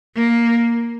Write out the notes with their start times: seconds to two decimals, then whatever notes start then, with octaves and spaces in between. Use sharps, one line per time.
0.16 A#3